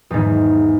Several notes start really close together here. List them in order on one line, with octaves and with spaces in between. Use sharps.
E2 G#2 E3